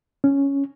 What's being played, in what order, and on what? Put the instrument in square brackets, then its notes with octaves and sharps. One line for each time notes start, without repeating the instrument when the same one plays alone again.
[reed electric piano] C#4